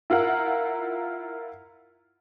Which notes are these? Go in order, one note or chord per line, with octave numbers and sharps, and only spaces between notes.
E4 F4 A#4 F#5